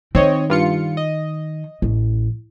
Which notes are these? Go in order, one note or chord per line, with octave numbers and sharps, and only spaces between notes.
D#3 C4 C#5 D#5
G2 F4 C#7
D#5
A1